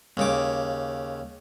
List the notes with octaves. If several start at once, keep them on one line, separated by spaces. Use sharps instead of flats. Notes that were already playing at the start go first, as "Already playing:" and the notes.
D#2 C#3 D6